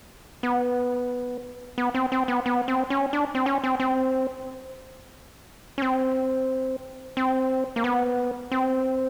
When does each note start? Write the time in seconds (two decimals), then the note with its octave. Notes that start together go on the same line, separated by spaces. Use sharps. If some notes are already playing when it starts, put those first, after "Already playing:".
0.43 B3
1.78 B3
1.94 C4
2.12 C4
2.28 B3
2.46 B3
2.68 C4
2.90 C#4
3.13 D4
3.35 C4
3.46 C#4
3.64 C4
3.80 C4
5.78 C#4
5.82 C4
7.17 C4
7.76 A#3
7.84 B3
8.51 C4